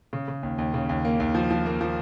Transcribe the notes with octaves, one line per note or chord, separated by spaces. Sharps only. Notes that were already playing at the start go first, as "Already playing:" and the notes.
C#3
C#3
D#2
D#2
C#3
D#2
A#3
D#2
F3
F3
A#3
F3